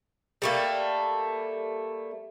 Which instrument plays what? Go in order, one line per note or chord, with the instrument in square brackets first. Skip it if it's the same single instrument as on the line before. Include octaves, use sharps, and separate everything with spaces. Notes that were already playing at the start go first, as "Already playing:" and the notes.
[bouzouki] G3 A3 A#3